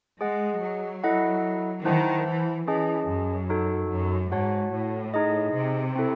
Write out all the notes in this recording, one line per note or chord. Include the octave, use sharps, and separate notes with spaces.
G#3 G#4 D#5 F#5
F#3
E4 A4 D#5 F#5
D#3 E4 C5 F#5 A5
E3
E3 C#4 G#4 D#5 A5
F#2
D#4 F#4 A4
F#2
G#2 F#4 C#5 F#5 A5
A2
D#4 G#4 D#5
C3
C4 E4 A4